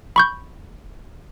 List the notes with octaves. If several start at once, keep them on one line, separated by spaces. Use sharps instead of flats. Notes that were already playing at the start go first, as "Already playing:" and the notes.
B5 C#6 G6